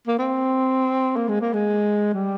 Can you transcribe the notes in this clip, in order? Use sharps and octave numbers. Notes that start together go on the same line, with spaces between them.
A#3
C4
A#3
G#3
A#3
G#3
G3